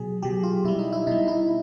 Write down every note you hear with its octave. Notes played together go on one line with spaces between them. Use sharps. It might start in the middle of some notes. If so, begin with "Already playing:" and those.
Already playing: B2 F#3 G#4
B2 F#3 G4
F4
B2 G3 E4
D#4
E4
B2 G3 D#4
E4